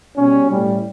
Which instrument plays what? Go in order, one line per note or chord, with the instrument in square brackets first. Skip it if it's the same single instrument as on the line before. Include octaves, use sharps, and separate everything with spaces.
[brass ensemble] B2 G3 C#4
A2 G3